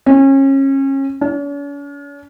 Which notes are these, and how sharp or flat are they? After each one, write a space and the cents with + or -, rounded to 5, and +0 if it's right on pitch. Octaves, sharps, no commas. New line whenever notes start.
C#4 -30
C#4 +45